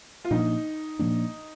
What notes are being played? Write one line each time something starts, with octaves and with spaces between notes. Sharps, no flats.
F4
A#2 F3 A#3 D4 D#4
A#2 F3 A#3 D4